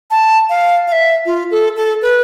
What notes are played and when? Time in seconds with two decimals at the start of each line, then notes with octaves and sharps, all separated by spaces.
0.11 A5
0.50 F5
0.88 F5
0.92 E5
1.26 F4
1.51 A4
1.76 A4
2.02 B4